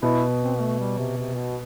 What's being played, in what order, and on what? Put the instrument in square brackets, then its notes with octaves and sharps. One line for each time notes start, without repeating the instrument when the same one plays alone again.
[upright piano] B2 [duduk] E4
[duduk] C4
A3
G3
C3
C3
B2